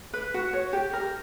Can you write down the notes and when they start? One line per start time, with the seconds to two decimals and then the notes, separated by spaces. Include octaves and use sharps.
0.13 B4
0.34 F#4
0.53 C#5
0.73 G4
0.93 A#4